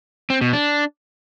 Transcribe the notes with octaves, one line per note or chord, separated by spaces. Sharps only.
C4
B2
D4